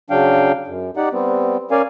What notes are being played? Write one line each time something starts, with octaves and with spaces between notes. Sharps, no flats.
C#3 F#3 D4 F5 G5
F#2
D#4 G4 D5 F#5
G3 B3 C4
C#4 A#4 D5 F5 G#5